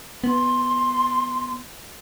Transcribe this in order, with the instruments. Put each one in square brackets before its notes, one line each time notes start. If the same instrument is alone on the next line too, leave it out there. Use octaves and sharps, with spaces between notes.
[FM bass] B3 [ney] C6